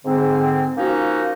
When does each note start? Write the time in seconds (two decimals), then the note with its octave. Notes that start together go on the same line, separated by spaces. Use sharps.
0.05 G#2 D3 C4
0.78 F3 A#3 C#4 D#4 F#4